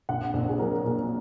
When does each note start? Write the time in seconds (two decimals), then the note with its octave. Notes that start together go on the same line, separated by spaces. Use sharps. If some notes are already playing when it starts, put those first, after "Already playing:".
0.09 A#1 F#5
0.34 A#1
0.49 G#4
0.58 F#3 A#4
0.84 A#2